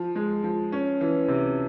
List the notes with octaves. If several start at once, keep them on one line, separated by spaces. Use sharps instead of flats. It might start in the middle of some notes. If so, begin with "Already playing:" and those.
Already playing: F3
G#3
F3
C#4
E3
C3